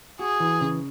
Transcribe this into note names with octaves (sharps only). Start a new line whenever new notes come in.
F#4 G#4
E3
C#3